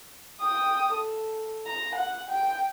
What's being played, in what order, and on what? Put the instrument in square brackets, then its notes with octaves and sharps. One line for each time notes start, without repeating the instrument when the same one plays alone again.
[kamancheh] G5 D#6
A4
A#5
F#5
G5